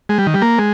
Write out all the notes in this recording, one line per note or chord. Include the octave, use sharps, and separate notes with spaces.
G#3
G3
D#3
G3
A#3
G#3